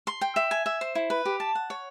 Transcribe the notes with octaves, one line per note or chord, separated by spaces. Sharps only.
C6
G5
E5
G#5
E5
C5
E4
B4
G4
A5
F#5
C#5